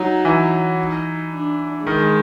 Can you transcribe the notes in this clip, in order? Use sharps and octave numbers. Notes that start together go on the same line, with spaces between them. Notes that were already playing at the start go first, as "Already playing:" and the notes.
Already playing: F#3 D#4
E3
D#4
D4
D#3 G#3